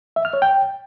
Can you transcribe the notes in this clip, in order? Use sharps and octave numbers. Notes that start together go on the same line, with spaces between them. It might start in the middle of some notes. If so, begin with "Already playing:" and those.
E5
F6
C#5
G5